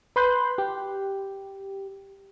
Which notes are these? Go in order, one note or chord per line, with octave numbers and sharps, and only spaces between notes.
B4 B5 C6 F#6 G6
G4